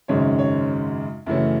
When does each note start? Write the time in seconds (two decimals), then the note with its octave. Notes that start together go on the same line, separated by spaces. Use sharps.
0.08 G#1 F#2 C#3 G#3 C#5
0.39 C#5
1.26 F#2 C#3 E3 A3 C#4